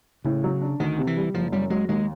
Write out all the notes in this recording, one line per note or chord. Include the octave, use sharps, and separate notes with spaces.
A2 C#3
F#3
D4
D2 D#3
C3
E3
G3
F#1 F3
F#2 G3
F#3 G#3
D#2 G#3